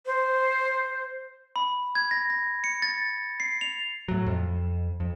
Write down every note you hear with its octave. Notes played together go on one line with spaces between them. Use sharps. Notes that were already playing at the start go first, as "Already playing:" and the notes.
C5
B5
G#6
A#6
A#6
C#7
A6
C7
F7
A2 F#3
F2
F2